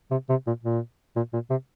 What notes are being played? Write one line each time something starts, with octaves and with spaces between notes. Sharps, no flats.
C3
C3
A#2
A#2
A#2
A#2
C3